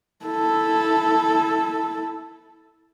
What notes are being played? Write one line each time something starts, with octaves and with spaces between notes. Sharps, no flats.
E4 A4